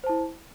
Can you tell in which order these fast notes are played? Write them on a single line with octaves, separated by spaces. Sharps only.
C5 A5 E4